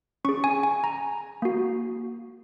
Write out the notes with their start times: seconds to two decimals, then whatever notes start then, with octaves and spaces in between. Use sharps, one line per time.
0.25 C#4 C#6
0.29 G#4
0.44 G#5
0.63 G#5
0.84 A#5
1.42 A#3 F#4